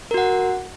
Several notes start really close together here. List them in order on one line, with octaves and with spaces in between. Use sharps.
A#4 F#4 F#5